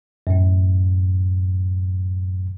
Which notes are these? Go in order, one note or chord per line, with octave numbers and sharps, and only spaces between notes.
F#2 A2